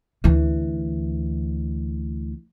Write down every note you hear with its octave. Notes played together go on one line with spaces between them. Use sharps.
D2 E3